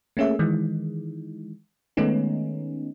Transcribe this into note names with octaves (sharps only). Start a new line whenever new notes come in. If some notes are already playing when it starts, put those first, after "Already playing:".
A3 A#3 C#4 G#4 E5
D#3 E3 G#3
D#3 G#3 A3 B3 C#4 D#4